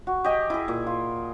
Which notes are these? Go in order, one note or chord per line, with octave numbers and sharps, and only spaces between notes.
F#4
G4 D#5 G#5
E4 G#4
A#2
F4